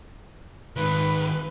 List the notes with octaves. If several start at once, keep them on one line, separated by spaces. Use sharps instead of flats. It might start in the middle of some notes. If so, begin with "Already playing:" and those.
G#2 D#3 B4